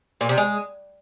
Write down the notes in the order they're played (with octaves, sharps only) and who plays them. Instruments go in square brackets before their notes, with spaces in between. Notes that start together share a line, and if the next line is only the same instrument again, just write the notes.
[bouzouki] A#2
C3
G#3